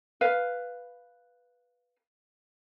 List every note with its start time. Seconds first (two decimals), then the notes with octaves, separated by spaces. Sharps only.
0.21 B4 F5